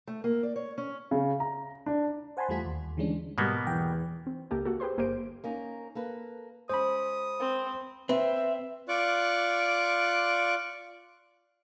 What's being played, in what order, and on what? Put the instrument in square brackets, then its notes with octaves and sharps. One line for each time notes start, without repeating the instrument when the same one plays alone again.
[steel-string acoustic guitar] A3
A#3
D5
C#5
C#4
[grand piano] C#3
A#5
D4
[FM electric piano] C5 F#5 G#5 A5 B5 C6
E2 G3 A3 F4 B6
D#2
D3 E3 G3 G#3 C#4 D4
[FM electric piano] G#2 G3 [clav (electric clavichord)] B2 A#3 B3
[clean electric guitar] E2 [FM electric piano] G5
[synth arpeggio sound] C4
C#2 A#3 G4 A4
A#3 F#4 G4 A4
G4 G#4 B4 C5 C6
G1 A#3 G4 A#4 C5 D7
[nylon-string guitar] A#3 C#4 D#4
A#3 A4 B4
[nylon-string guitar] G#3 C#4 [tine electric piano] C5 B5 [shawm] D#6
[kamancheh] C4
[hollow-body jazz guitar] C4 [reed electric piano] B4 [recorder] E5
[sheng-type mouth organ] F4 D5 C#6 D6 F#6